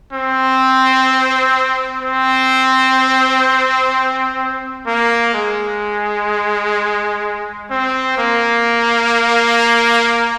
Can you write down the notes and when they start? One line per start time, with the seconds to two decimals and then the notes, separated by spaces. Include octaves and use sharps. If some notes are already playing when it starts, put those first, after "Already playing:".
0.13 C4
2.03 C4
4.87 A#3
5.34 G#3
7.71 C4
8.18 A#3